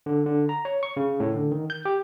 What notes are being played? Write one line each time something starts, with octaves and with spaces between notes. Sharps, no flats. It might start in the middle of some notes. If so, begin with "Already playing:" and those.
D3
D3
A#5
C#5
C#6
C#3
A2
D3
D#3
G6
G4